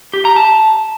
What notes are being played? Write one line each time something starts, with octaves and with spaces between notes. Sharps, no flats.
G4
A#5
A5